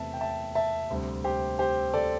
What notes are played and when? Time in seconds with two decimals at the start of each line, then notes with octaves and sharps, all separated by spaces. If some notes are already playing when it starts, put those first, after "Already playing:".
Already playing: E2 C3 A3 C4 E5 A5
0.14 G5
0.21 E5 A5
0.55 E5 A5
0.90 D2 C3 G3 C4
1.24 G4 C5
1.59 G4 C5
1.94 A4 D5